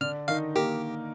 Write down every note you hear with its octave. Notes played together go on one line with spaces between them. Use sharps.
D3 D4 F6
D#3 D#4 F5
A#3 G4 A#4